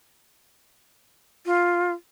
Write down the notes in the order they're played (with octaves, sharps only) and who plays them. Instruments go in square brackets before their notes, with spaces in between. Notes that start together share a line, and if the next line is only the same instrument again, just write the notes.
[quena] F4